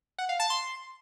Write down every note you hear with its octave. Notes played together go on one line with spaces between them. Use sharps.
F#5
F5
A5
C6